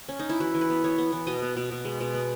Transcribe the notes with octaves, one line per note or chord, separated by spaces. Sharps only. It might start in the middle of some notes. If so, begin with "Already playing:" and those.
C#4
D#4
E4
E3 F#4
E3
B4
B3
B3 C#5
B3
E3
B2 D#5
B3
B2
B2
G#3
B2
B3